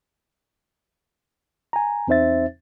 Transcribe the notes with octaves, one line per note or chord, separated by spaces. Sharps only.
G#5 A#5
E2 C4 D#4 C5 E5 A6